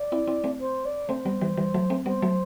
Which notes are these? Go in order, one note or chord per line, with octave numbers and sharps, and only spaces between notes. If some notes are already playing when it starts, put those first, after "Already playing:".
Already playing: D5
C4 E4
C4 E4
A3 C4
C5
D5
A3 C4 C5
G3 B3
E3 G3
E3 G3
F#3 A3
A3 C4
G3 B3 C5
F#3 A3